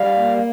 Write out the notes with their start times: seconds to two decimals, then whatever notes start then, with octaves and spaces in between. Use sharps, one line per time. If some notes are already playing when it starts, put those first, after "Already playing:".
Already playing: G3 F5
0.16 A#3